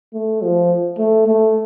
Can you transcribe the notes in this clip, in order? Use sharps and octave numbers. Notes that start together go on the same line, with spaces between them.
A3
F3
A3
A3